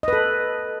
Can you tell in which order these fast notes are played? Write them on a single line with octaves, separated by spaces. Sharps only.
D#5 B4 A4